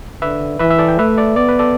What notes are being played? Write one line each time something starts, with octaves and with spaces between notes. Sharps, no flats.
D3 B4 E5
E3 B4 E5
E5
A4 D5
G5
A3 B4 E5
A4 D5
B3 D5
B4
A4 D5